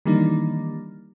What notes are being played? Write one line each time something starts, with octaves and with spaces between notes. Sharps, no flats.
D#3 E3 G3 A#3 D4 D#4